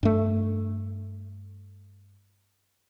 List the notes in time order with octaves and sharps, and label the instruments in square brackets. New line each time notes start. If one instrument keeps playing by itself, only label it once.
[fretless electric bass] G2 A3